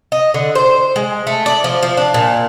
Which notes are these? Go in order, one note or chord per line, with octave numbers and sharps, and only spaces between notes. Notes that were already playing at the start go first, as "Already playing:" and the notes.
D#5
D3
C5
G#3
A3
D5
F3
F3
D4
A#2